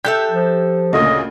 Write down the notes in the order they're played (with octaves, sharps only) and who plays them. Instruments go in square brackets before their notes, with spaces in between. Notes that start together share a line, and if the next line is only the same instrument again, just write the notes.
[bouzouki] G4 A4 E5 [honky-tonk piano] F#6 G6
[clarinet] F3
[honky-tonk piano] D2 A#2 C#3 [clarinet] D#5